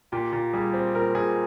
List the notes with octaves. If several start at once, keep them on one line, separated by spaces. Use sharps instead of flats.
A#2 G4
A#2
G3 G#4
C4
A#2 A#4
A#2 G#4